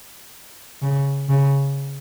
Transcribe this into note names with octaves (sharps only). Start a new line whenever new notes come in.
C#3
C#3